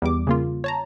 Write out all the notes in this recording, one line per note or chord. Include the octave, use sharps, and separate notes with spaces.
E2 G3 D6
C#3 A#3 F4
C#5 A5 A#5